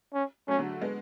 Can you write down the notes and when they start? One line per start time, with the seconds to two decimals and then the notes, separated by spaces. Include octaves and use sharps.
0.14 C#4
0.48 F#3 A3 C#4
0.59 D3 F#3
0.81 G#3 B3